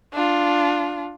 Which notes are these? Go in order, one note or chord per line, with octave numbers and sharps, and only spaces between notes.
D4 F4